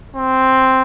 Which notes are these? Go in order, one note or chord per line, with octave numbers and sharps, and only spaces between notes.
C4